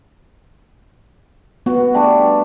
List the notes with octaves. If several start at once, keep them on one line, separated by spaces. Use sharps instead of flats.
B3 F#4
G3 A3 D4